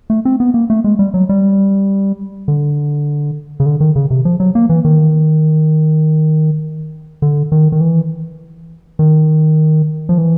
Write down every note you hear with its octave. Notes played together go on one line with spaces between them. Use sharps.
A3
C4
B3
A#3
A3
G#3
G3
F#3
G3
D3
C#3
D3
D#3
C#3
C3
F3
F#3
A#3
E3
D#3
D3
D#3
D#3
E3
D#3
F3
E3